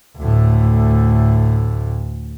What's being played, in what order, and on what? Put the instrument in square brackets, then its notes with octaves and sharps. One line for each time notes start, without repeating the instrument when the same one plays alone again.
[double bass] D2 A2